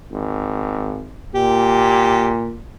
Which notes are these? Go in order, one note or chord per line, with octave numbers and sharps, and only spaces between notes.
G#1
A#2 G4